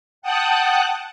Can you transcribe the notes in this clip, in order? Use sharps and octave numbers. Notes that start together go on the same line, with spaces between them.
F#5 G5 A5 D#6 F#6